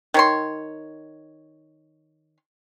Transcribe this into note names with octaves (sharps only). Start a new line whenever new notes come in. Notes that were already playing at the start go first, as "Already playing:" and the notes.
D#3 C#5 C6